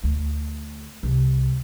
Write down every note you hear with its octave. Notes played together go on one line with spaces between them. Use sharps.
D2
C2